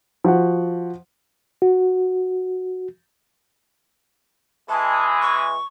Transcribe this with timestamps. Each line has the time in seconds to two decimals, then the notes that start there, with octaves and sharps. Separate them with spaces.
0.24 F3 F#4 F#5
1.62 F#4
4.69 E3 G#3 A5
5.22 C#6